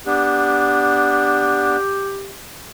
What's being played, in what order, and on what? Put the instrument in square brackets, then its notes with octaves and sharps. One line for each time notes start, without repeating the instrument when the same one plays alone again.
[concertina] B3 D4 [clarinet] G4